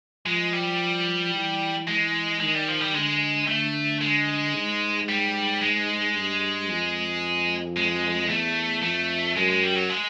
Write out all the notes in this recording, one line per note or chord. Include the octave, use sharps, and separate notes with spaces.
F3 G#3
G3
E3
E3 G#3
D#3 G#3
G3
F3
G3
D3 G#3
D3 A3
G#3
G#2
G3
G#3
G2
F2
G#3
E2 A3
F2 A3
F#2 G#3
G#3
G3
F#3
G#3